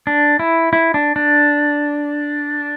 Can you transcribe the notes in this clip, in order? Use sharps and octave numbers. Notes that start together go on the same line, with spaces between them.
D4
E4
E4
D4
D4